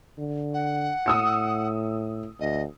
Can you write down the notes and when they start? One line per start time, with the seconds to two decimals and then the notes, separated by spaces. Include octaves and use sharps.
0.18 D3
0.54 F#5
1.06 A2 D#6 E6 C#7
2.41 D2 D#5